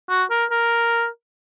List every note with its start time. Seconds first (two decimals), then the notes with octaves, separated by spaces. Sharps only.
0.10 F#4
0.30 A#4
0.51 A#4